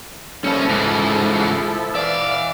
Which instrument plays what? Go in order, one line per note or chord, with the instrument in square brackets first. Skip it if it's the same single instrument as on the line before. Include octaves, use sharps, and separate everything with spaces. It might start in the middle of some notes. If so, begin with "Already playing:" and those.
[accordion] F3 E4 A4 [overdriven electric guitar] G3 A#3 [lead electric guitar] C#4
[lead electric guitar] G#2 [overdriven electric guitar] C#3 E3
[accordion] E3 [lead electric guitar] D5 [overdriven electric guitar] E5 F5